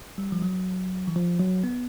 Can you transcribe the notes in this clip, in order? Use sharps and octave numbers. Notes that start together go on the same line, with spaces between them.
G3
F3
F#3
E3
F3
F#3
B3